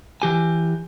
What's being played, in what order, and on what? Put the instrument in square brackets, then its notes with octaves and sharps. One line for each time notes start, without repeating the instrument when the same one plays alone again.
[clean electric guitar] E3 G4 G#5